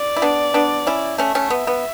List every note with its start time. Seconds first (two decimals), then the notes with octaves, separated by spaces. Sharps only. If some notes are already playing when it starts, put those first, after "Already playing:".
Already playing: D5
0.16 E4
0.22 B3 D4
0.54 B3 D4
0.87 C#4 E4
1.18 A3 C#4 E5
1.35 A3 C#4
1.50 B3
1.67 B3